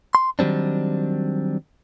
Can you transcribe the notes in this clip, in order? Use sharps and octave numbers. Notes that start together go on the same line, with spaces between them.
C6
D#3 F#3 G3 C4 D4